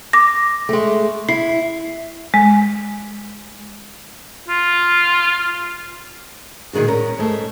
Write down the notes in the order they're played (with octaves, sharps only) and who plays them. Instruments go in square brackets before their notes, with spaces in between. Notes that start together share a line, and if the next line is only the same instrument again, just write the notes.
[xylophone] D6 A#6
[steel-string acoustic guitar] G#3 A3
[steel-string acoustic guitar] E4 [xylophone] C7
[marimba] G#3
[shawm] F4
[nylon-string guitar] A#2 D3 D#3 G#3 F#4
C#4 A#4
G#2 A3